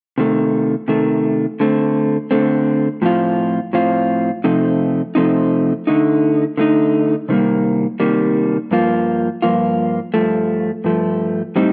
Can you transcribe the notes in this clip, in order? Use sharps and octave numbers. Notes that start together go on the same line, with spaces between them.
C3 D#3 A3
C3 D#3 A3
D3 A3 C4
D3 A3 C4
A2 F3 C4 F4
A2 F3 C4 F4
C3 F3 A3 C4 D#4
C3 F3 A3 C4 D#4
D3 A3 D#4
D3 A3 D#4
C3 D#3 G3 A#3
C3 D#3 G3 A#3
G2 F3 A#3 F4
G2 F3 A#3 F4
G2 F3 A3
G2 F3 A3
A2 G3 C4 D#4